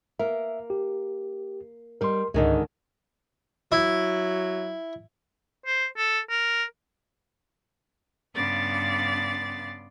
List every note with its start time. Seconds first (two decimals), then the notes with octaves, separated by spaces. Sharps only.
0.19 A#3 A#4 E5
0.70 G4
2.01 G3 D#4 A#4 C6
2.34 C#2 G#2 D3 D#3 G#3 C#4 D#5
3.72 F#3 E4
5.66 C5
5.97 A4
6.30 A#4
8.34 G2 C#3 B3 D5 C6 A6